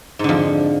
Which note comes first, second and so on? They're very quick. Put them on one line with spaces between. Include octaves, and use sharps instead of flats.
G#2 D3 F2